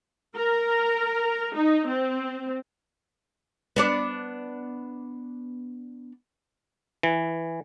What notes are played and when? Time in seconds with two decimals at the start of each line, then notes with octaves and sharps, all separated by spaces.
0.36 A#4
1.55 D#4
1.87 C4
3.76 B3 D4 D5
7.03 E3